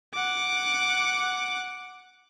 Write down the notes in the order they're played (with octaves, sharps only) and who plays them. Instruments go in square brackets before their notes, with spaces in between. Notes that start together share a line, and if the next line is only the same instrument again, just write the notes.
[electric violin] F#5 D6